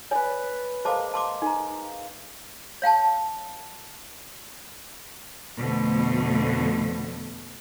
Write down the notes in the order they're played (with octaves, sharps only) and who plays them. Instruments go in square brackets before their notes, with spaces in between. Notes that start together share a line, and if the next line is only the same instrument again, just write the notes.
[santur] B4 D5 [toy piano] C#5 G#5
[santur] G#3 A#3 [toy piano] C5 A5 D6
[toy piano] A5 C6 D6
D#4 A#5
C#5 F5 G5 A5
[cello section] F2 B2 D3 A3